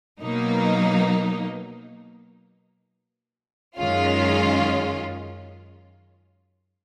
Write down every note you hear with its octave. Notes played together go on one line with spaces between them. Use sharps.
B2 F#3 A#3 D#4
F#2 D#3 G#3 C#4 F4